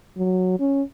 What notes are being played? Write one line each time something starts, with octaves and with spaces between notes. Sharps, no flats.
F#3
C#4